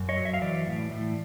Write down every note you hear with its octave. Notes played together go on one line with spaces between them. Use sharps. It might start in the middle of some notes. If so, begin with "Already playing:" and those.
Already playing: F#2
C#5 D#5
F#3
E5
F5
E3 D5 E5
A2
A2